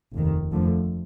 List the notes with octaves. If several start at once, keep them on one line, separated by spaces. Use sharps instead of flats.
F1 D#2 D#3
F2 D3 F3 A3